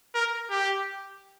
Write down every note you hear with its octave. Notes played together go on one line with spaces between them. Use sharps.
A#4
G4